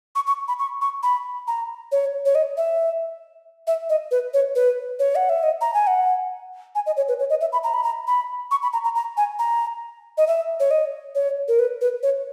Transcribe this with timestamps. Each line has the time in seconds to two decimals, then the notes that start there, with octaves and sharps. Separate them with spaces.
0.15 C#6
0.27 C#6
0.48 B5
0.59 C#6
0.81 C#6
1.03 B5
1.48 A#5
1.92 C#5
2.25 C#5
2.35 D#5
2.57 E5
3.67 E5
3.90 D#5
4.11 B4
4.34 C#5
4.55 B4
4.99 C#5
5.16 F#5
5.29 E5
5.43 D#5
5.61 A#5
5.74 G#5
5.87 F#5
6.75 G#5
6.86 D#5
6.97 C#5
7.08 B4
7.20 C#5
7.30 D#5
7.41 E5
7.53 B5
7.64 A#5
7.74 B5
7.84 A#5
8.07 B5
8.51 C#6
8.62 B5
8.73 A#5
8.84 A#5
8.95 A#5
9.17 G#5
9.39 A#5
10.18 D#5
10.27 E5
10.60 C#5
10.71 D#5
11.15 C#5
11.48 A#4
11.59 B4
11.81 B4
12.03 C#5